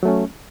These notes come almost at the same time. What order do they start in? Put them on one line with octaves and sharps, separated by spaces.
F#3 A3 C#4